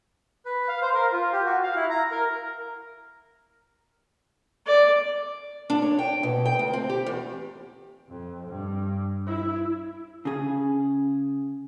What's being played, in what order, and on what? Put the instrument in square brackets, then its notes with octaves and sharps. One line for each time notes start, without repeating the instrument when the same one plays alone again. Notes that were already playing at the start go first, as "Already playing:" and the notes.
[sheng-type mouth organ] B4
F5
C5
A#4
F4
G4
F#4
F5
E4
A#5
A#4
[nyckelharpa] D5
[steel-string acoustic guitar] D4
C#5
G5
B2
G5
D2
C4
G4
E2
[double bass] F2
G2
E4
[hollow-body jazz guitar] C#3 G#4